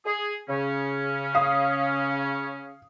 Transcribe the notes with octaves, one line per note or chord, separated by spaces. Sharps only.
G#4
C#3 C#4
F5 D#6